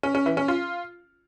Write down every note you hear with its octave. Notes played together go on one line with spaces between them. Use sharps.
C#4
C#4
E3
C#4
F4